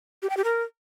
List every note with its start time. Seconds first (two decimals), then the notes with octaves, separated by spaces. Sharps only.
0.22 G4
0.30 G5
0.37 G4
0.44 A#4